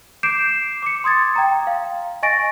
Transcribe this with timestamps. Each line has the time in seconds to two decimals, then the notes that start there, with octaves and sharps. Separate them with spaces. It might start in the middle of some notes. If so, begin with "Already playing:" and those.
0.23 D6 G6 C7 D7 E7
0.82 D6 C#7
1.04 C6 D#6 G#6 A6
1.36 G5 A#5
1.67 F5
2.23 D#5 G#5 C#6 A6 A#6 D7